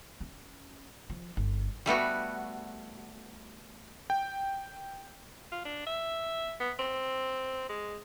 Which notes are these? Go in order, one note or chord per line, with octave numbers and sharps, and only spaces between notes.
C#4
F3
G1
G3 A3 B3 F#4
G5
F4
D4
E5
B3
C4
G#3